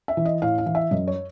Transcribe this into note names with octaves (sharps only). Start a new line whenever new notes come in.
E5
E3
D#5
A2 F5
F5
E3
E5
F#2 D#5
C#5